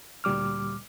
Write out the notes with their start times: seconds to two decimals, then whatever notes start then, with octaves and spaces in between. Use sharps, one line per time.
0.24 D2 A#2 G3 D6 F6